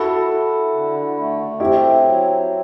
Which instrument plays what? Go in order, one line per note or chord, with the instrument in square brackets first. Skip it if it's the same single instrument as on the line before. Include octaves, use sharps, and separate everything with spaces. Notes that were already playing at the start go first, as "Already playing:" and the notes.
Already playing: [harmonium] E4 [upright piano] F#4 A4
[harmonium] E4
D3
A3
[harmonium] C4 [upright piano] E4 G4
[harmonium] F#3
C4